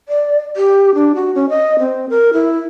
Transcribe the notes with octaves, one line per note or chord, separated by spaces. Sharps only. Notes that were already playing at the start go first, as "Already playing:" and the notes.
D5
G4
D4
F#4
C#4
D#5
C4
A#4
E4